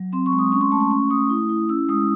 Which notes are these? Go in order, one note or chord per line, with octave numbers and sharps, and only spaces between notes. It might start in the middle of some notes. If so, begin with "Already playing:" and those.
Already playing: F#3
C4 C6
C#6
G#3
D#6
C#4 C#6
C6
A3 A5
C6
C#4 C#6
A3 D#6
E4
E4
C#4 E6
G#3 D#6